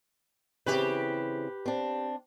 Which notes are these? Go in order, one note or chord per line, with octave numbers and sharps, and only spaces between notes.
C#3 E3 C4 G4 B4
C4 D4